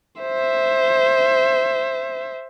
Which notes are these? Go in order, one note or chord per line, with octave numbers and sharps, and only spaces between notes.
C5 E5